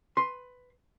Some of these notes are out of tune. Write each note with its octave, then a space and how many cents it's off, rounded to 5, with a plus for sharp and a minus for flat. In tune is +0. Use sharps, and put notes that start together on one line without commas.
B4 +10 C6 +10